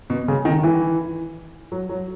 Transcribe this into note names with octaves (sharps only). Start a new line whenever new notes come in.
B2
C#3
D#3
E3
F#3
F#3